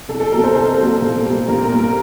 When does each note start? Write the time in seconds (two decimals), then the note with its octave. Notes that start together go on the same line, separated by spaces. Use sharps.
0.09 C2 A4
0.20 A4
0.32 C3 F#3 A#3 A#4
0.44 C5
0.55 C2 C5
0.78 C3 F#3 A#3
1.02 A#2
1.25 G3 A#3
1.48 A#2 A#4
1.63 A#4
1.72 G3 A#3
1.79 A#4